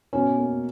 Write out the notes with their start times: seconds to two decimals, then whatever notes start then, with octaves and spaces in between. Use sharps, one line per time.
0.13 B2 C#4
0.38 A#3